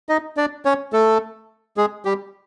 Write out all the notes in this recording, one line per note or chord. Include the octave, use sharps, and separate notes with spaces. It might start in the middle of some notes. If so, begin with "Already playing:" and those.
D#4 D#5
D4 D5
C#4 C#5
A3 A4
G#3 G#4
G3 G4